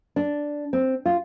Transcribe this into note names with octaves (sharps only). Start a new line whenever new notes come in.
D4
C4
F4